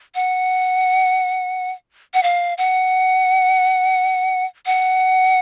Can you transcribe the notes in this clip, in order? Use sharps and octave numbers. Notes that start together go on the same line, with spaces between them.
F#5
F#5
F5
F#5
F#5